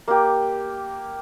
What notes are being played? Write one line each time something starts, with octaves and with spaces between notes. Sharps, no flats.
A#3 G4